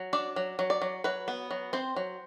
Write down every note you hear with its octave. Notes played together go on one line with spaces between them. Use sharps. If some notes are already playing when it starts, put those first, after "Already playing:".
Already playing: F#3
D4 D5
F#3
F#3
D5
F#3
F#3 B4
B3
F#3
C4 C5
F#3